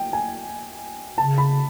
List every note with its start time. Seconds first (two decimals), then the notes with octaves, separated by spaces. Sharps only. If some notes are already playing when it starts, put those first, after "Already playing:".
Already playing: G5
0.13 G#5
1.18 C#3 A5
1.38 B5